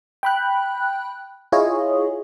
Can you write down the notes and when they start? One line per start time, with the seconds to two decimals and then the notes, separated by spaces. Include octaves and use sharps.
0.23 G5 B5 F#6
1.52 E4 F4 G#4 C#5 D#5